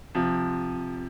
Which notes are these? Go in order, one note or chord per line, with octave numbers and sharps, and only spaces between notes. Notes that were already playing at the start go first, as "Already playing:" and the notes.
C3 F3